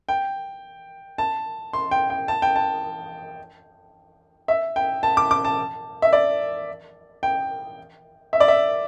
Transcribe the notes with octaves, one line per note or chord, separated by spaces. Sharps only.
G5
A5
C6
G5
G5
A5
G5
A5
E5
G5
A5
D6
D6
A5
E5
D5
G5
E5
D5
E5